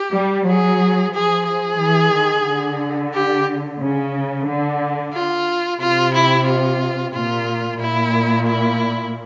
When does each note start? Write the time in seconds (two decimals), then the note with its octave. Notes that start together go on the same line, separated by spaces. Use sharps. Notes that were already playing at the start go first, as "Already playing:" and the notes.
Already playing: G4
0.14 G3
0.48 F#3 G#4
1.14 F3 G#4
1.47 G#4
1.80 E3
2.14 D#3
2.47 D3
3.14 G4
3.81 C#3
4.47 D3
5.14 F4
5.80 C3 F4
6.14 E4
6.47 F4
7.13 A#2 F4
7.79 A#2 E4
8.47 E4